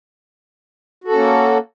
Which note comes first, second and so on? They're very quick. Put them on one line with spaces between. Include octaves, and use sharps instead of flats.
F#4 A4 C#4 A#3